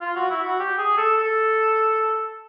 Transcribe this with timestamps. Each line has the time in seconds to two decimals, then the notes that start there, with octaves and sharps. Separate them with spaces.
0.01 F4
0.16 F#4
0.30 E4
0.44 F#4
0.59 G4
0.78 G#4
0.97 A4
1.17 A4